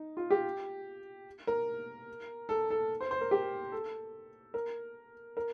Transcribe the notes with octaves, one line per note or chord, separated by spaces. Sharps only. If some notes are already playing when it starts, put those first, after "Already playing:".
Already playing: D#4
F4
G4
A#4
A4
A4
C5
C5
A#4
G4
A4
A#4
A#4